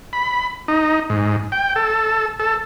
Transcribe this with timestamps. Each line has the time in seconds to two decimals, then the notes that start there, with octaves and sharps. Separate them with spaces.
0.13 B5
0.68 D#4
1.10 G#2
1.52 G5
1.76 A4
2.40 A4